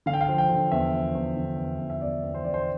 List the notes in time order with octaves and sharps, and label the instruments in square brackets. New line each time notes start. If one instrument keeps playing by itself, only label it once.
[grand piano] D3 F5
G5
F5
F3
G5
D3
E2 E5
F3
E2
D3
E2
E2
E5
E2 D5
E2
C5
D3 D5
C5